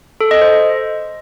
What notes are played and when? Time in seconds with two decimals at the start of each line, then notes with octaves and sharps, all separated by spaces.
0.21 A4
0.31 D#5
0.42 C5